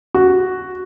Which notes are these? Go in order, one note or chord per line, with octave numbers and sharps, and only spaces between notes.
F#4